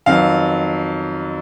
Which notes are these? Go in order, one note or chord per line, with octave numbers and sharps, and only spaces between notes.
F2 D#3 F#3 B3 F5